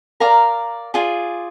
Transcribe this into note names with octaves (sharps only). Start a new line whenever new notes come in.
A#4 D5 F5 A#5
F4 G#4 D5 G#5